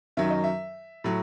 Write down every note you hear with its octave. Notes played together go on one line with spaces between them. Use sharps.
F#2 D#3 F#3 E5
D#5
E5
A2 F#3